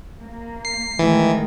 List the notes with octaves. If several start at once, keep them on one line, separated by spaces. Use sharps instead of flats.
A#3
C7
D#3 E3 G#3 A3